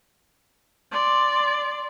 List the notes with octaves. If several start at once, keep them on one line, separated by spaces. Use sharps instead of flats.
D5 C6